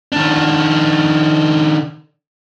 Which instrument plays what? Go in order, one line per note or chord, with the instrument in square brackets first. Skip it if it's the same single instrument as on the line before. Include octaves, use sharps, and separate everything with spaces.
[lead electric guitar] D#3 D4